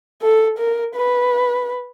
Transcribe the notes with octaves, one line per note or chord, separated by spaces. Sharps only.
A4
A#4
B4